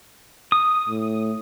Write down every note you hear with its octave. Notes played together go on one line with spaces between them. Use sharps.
D#6
A2